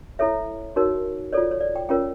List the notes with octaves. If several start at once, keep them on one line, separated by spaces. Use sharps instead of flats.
E4 A4 C#5 E5
D#4 F#4 A#4 C#5
F4 A4 C#5 D5
C#5
D5
G5
C#4 F4 A#4 C#5 G5